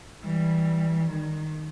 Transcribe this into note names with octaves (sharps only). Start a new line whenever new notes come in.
E3 G3
D#3